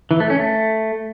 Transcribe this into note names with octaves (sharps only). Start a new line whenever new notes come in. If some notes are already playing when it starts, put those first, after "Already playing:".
E3
A3
C#4
A3